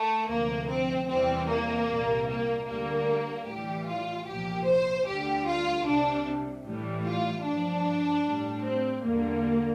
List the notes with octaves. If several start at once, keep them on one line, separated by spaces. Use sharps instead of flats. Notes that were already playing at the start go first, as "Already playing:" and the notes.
Already playing: A3
D2 C3 F3 A#3
C4
E2 C3 E3 G3 C4
A#3
C2 A#2 G3
A#3
D2 D3 G3 A#3
A2 E3 G3 G4
F4
C2 A#2 F3 G4
C5
D2 D3 G3 G4
F4
C2 C3 G3 D4
A2 E3 G3
F4
G2 F3 D4
A2 G3
C4
E2 D3 G3 A#3